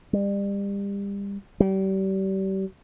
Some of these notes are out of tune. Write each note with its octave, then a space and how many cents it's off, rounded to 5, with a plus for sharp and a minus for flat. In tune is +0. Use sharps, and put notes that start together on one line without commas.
G3 +30
G3 -35